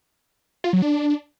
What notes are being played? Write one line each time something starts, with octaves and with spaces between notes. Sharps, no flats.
F4
F#3
D4